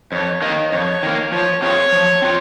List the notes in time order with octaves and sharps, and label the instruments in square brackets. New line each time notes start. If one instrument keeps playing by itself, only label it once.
[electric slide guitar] F2 [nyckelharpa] C#5
[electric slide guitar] D#3 A#3 [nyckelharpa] D#5
[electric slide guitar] F2 [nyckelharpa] C#5
[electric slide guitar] D#3 A#3
[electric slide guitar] F3 [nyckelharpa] C#5
[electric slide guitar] C4 F4 G#4 [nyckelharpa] C#5
[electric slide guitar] F3
C4 F4